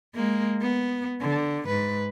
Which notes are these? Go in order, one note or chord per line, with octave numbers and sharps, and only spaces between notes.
G#3 A#3
B3
D3
G#2 B4